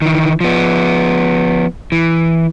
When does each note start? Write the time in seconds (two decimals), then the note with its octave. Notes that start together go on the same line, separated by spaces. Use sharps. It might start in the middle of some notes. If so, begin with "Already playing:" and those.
0.02 D#3 E3
0.41 F3 B3
1.92 E3